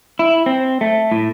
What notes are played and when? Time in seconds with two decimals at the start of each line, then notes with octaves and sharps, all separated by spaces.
0.19 E4
0.46 C4
0.81 A3
1.12 A2